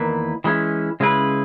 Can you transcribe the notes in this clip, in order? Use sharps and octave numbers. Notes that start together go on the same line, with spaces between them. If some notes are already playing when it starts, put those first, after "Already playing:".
Already playing: E2 D#3 A#3 E4 B4
E3 G#3 C#4 E4
C#3 G#3 C#4 E4 B4